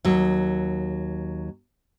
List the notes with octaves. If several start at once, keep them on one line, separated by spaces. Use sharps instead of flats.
D#2 F#3